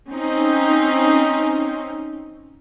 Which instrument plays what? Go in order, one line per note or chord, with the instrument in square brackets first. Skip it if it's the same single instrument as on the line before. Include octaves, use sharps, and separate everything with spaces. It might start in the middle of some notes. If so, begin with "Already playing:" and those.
[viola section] C4 C#4 D#4